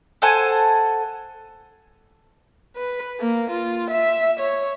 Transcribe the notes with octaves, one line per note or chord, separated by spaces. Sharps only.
A4 C5 F#5 G#5
B4
A#3
F4
E5
C#5